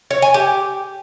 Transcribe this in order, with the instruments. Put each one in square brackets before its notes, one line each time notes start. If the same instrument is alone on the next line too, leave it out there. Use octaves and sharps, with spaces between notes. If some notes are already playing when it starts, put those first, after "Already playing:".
[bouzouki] C#5
G#5
G4